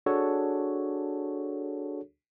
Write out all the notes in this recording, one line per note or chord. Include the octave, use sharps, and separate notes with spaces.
D4 F#4 G#4 A4 C#5